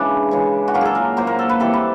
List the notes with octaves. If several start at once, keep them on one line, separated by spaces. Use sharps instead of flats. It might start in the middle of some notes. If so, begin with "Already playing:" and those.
Already playing: C#3 E3 G#3 D4
C#3 E3 G#3
F#4
A#2 F#3 A#3 F4
G#4 A4
A#4
A#2 F#3 A#3 C5
A#4
A4
B4
E3 G3 C4 A4
B4